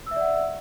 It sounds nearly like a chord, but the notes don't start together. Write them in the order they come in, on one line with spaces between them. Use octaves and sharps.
E6 E5 D5 F#5